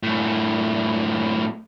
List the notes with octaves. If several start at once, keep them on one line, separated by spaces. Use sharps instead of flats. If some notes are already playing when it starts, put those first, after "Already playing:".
F#2 A2